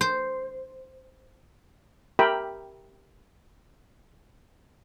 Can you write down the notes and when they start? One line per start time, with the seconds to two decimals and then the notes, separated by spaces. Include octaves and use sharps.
0.01 C5
2.19 G4 A#4 E5 G5 B5